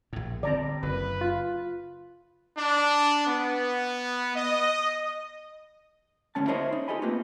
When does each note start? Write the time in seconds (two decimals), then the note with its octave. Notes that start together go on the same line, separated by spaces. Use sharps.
0.13 A#1 A2
0.43 D3 G3 C4 D5 A#5
0.83 F#1 B4
1.21 F4
2.58 D4
3.27 B3
4.35 D#5
6.35 D2 A2 E3 G#3 C#4 A5
6.47 E4 F#4 A#4 C5 C#5 D#5
6.72 D#4
6.88 F4 G4 A4 D#5 G#5 B5
7.02 A3 A#3 C4 D#4 F4 B4